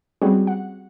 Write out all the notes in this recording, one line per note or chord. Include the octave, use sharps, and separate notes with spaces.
G3 G#3 C4 C#4 F#4 G#4
F#5